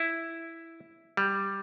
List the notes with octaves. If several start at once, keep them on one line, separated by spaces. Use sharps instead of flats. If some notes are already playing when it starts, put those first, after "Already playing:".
Already playing: E4
G3